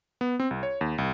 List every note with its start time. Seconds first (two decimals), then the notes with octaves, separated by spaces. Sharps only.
0.21 B3
0.40 C4
0.51 C2
0.63 C#5
0.81 D#2
0.98 C2